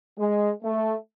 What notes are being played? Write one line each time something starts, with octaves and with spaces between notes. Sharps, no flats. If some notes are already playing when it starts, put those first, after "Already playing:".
G#3
A3